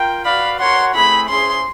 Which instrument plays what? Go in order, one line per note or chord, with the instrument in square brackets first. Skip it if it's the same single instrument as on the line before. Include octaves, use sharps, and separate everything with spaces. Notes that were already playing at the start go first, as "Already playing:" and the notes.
Already playing: [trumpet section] F4 A#4 G5
[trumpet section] F#4 B4 D5 F5 [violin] B5
[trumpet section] F#4 A#4 C#5 F#5 [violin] C6
[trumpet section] A3 C4 E4 G#4 [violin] B5
[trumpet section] C#4 E4 G#4 C5 [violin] C6